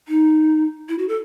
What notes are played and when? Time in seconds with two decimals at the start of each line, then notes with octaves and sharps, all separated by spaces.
0.08 D#4
0.89 E4
0.98 F#4
1.09 A4